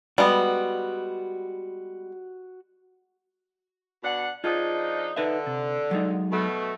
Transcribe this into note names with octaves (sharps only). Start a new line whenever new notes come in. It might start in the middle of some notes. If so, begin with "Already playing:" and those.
G3 G#3 B3 F#4
B2 D4 F#5
F3 D4 D#4 F4 G#4
D3 D#4 B4 E5
C3
F#3 G#3 D#4
B2 A3